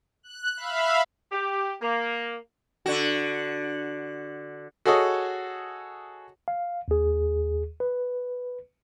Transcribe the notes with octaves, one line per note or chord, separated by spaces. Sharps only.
F#6
E5 F5 B5
G4
A#3
D3 F#4
F#4 G#4 A4 C#5 D#5
F5
D#2 G#4
B4